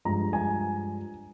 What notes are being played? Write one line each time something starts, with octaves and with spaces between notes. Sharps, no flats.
G2 F3 G#3 A#5
G#5